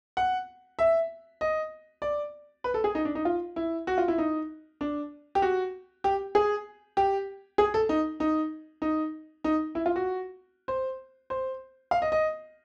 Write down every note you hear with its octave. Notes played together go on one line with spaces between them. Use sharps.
F#5
E5
D#5
D5
B4
A4
G#4
D#4
D4
D#4
F4
E4
F#4
F4
E4
D#4
D4
G4
F#4
G4
G#4
G4
G#4
A4
D#4
D#4
D#4
D#4
E4
F4
F#4
C5
C5
F5
D#5
D#5